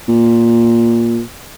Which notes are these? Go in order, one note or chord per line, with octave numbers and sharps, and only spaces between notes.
A#2